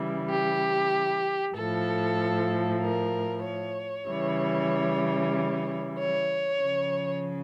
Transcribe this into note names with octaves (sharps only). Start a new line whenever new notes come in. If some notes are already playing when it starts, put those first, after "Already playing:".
Already playing: C#3 E3 G3
G4
A2 F3 A4
A#4
C#5
C#3 E3 G3
C#5
C#3 F3